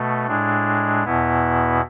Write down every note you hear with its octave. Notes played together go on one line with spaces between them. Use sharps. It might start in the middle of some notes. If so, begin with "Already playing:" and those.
Already playing: B2 A3
A2 G#3 D4
E2 B2 B3 E4